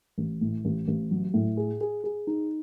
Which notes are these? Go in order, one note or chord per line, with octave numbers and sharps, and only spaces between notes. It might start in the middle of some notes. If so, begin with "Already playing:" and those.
A1
A2
A1
A1
F#3
A2
G#4
G#4
G#4
D#4